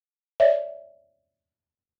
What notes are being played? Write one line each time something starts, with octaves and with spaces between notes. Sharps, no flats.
C#5 D5 E5